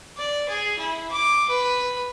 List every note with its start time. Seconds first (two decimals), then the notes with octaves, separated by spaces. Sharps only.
0.17 D5
0.49 G#4
0.79 E4
1.11 D6
1.49 B4